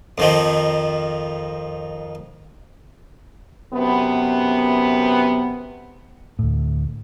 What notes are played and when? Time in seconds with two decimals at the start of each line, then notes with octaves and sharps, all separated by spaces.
0.18 F2 D#3 F3
3.73 F#2 C3 B3
6.39 D2 A2